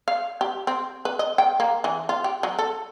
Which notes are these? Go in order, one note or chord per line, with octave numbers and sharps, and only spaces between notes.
F5
G4
C4
B4
D#5
G5
A#3
E3
F4
G4
F#3
A4